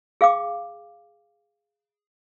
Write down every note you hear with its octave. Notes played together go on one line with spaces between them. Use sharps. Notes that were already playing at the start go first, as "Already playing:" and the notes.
G#4 F5 G5 D6